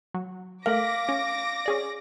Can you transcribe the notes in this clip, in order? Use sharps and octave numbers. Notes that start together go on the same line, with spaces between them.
F#3
A3 A#4 F5 D6 A#6
C#4
C#4 G#4 D5